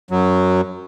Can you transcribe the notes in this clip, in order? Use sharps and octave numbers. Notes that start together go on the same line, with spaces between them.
F#2 F#3